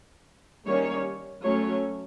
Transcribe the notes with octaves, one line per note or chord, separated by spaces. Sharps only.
D#3 G3 A#3 C#4 C#5
F#3 A3 C#4 C#5